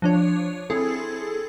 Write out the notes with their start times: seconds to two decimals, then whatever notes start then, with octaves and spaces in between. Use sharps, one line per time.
0.02 F3 D4 C#5
0.70 C4 E4 G#4 A4